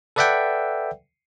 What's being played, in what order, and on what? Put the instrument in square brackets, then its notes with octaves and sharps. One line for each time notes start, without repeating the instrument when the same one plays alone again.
[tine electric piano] A4 B4 D5 E5 F#5 G5